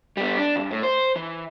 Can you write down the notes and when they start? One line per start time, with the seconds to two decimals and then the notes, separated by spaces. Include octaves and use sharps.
0.17 G3 B3
0.39 D4
0.56 C#2 G2
0.71 A2
0.83 C5
1.16 E3